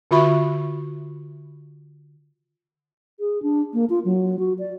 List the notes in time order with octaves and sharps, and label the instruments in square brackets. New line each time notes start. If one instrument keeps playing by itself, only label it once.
[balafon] D3 F4 F#4 E5 B5 C#6
[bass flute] G#4
D4
A#3
F4
F#3
F#4
D5